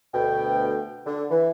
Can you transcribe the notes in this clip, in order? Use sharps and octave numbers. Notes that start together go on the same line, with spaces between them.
D2 B2 G5
D3
E3